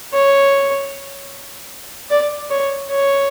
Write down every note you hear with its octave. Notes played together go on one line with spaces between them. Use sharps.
C#5
D5
C#5
C#5